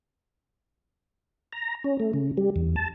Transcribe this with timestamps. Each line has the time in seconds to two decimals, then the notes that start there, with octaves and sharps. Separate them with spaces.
1.53 A#5
1.84 C#4
2.00 A3
2.13 C#3
2.37 G3
2.56 E2
2.76 A5